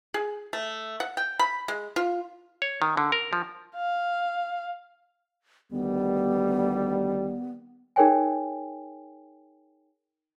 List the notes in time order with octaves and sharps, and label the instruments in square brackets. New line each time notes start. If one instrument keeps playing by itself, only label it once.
[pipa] G#4
A3
F#5
G5
B5
G#3
F4
[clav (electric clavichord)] C#5
D#3
D3
A#4
F3
[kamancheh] F5
[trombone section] D2 D#3 G3 [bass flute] B3
[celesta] D#4 G#4 A#4 C#5 G5 G#5